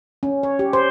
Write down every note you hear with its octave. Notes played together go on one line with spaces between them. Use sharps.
C#4
C#5
G4
C5